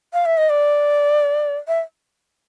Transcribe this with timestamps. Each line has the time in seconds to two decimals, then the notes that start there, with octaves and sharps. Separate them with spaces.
0.13 F5
0.26 E5
0.38 D#5
0.50 D5
1.68 E5